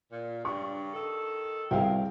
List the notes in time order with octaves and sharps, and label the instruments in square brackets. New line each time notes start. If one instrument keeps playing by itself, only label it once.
[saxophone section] A#2
[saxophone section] G2 C#3 D4 [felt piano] C#6
[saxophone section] D#3 A4
[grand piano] C2 [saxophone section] B2 C4 A#4 [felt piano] G#4 F5 G5